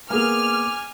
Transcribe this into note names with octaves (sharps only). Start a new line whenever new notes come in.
A#3 B3 G#4 G#5 D6 F6